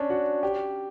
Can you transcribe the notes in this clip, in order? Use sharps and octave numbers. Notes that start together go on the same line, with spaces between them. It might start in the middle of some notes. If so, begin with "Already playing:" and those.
Already playing: C#4 D4
F#4
G4